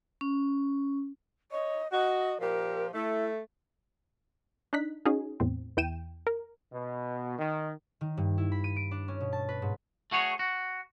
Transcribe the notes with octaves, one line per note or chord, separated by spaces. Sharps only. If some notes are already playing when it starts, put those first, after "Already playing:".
C#4
C#5 D#5
F#4 D#5
A#2 F3 G4 A#4
A3 E4
D4 D#4 F#6 B6
C#4 D#4 F#4 G#4
E2 A2 C4
E2 E4 G5 D#7 E7
A#4
B2
D#3
D#3
G2
E4
B5
D#7
D7
D4
C#4
B2
A5
B4
G#2
A3 F#4 G#4 C#5
F#4